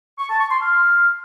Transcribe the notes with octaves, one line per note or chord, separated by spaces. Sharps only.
C#6
A5
C#6
C6
F6